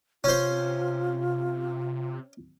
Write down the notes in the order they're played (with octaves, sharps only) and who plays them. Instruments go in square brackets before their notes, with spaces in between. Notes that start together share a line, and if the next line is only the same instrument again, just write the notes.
[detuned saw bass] C3 [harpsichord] C#4 C5 [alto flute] F4